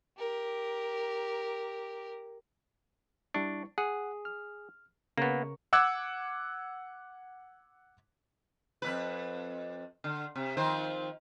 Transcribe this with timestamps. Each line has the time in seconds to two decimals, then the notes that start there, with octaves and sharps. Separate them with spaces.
0.18 G4 A#4
3.34 G3 D4 E4 C#6
3.78 G#4 F#5
4.25 F6
5.18 C#3 A#3 B3 A#4 C#6
5.73 F#5 D6 E6 F#6 G#6
8.82 F2 A#2 B4
10.04 D3
10.35 C3
10.57 D#3 F3 C5